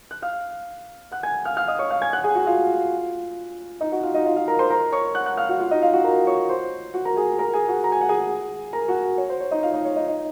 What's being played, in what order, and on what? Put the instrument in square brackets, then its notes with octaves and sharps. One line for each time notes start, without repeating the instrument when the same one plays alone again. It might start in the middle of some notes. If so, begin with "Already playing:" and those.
[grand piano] F#6
F5 F6
F#5 F#6
G#5 G#6
F5 F6
F5 F6
D#5 D#6
C#5 C#6
F5 F6
G#5 G#6
F#5 F#6
G#4 G#5
F#4 F#5
F4 F5
D#4 D#5
F#4 F#5
F4 F5
D#4 D#5
F4 F5
F4 F5
A#4 A#5
C5 C6
A#4 A#5
C#5 C#6
F#5 F#6
F#5 F#6
F5 F6
F#4 F#5
F4 F5
D#4 D#5
F4 F5
F#4 F#5
A#4 A#5
C#5 C#6
C5 C6
F#4 F#5
A#4 A#5
G#4 G#5
A#4 A#5
G#4 G#5
F#4 F#5
A#5
G#5
F#5
G#4 G#5
A#4 A#5
F#4 F#5
C#5
C5
C#5
D#4 D#5
F4 F5
D#4 D#5
C#5
D#4 D#5
D#4 D#5